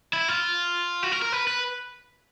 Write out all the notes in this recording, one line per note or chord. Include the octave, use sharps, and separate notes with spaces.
E4
F4
F#4
A#4
A#4
B4
B4